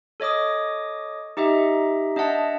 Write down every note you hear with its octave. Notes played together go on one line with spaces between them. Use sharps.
A4 C#5 D#5 D6 D#6
D#4 G4 D#5 E5
D4 D#5 E5 F#5 A5